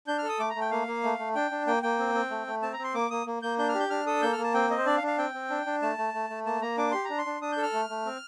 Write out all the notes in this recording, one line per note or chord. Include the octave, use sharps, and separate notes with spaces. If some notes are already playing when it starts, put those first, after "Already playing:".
D4 G6
F6
A4
D#6
A3 D6
A#5
A3
G5
A#3 F5
A#3
A3
A3
D4 G5
D4
A#3 G5
A#3 G5
C4
C4
A3
A3
C4 A5
A#5
C4
C6
A#3 D6
A#3 D#6
A#3
A#3 G6
D4 G6
F6
G4
G6
D4 F6
A4 D#6
A#3 G6
F6
A#3
A5
C4 G5
C4 D#5
C5
D4 D5
F5
D4
F5
C4 G5
C4
D4
D4
A3 A5
A3
A3
A3
A#3 A5
A#3 A#5
D4 D6
G4 C6
D4 A#5
C6
D4
D4 D#6
G6
A4
F6
A3
A3
C4